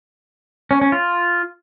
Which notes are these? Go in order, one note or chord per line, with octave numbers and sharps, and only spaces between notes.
C#4
C#4
F4